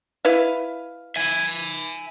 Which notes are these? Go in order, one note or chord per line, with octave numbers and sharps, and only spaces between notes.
E4 B4 F5
E5 G#5